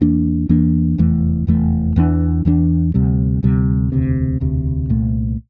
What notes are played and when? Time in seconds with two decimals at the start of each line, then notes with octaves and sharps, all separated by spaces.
0.01 E2 E3 A#3 D4
0.49 E2 E3 A#3 D4
0.98 F1 E2 E3 A3
1.47 F1 E2 E3 A3
1.96 E2 E3 A#3 D4
2.45 E2 E3 A#3 D4
2.94 D2 C3 G3
3.43 D2 C3 G3
3.92 E1 D2 C3
4.40 E1 D2 C3
4.90 C2 A#2 A3